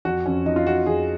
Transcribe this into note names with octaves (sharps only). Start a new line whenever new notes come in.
F2 F#4
F2 C#4
F3 D#4
F4
F3 F#4
F2 G#4